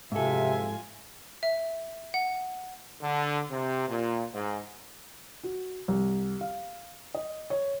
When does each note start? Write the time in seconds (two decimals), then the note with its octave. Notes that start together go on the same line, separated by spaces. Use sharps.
0.12 F#1 F2 G#2 C3 F4 A4 E5 G#5
1.43 E5
2.14 F#5
3.02 D3
3.50 C3
3.88 A#2
4.34 G#2
5.44 F#4
5.88 C2
6.41 F5
7.15 D#5
7.50 C#5